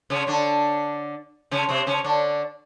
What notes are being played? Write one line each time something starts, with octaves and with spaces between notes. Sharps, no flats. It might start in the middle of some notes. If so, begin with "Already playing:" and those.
C#3 C#4
D3 D4
C#3 C#4
C3 C4
C#3 C#4
D3 D4